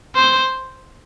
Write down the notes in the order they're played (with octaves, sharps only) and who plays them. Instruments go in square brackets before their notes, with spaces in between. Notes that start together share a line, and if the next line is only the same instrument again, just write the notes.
[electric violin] C5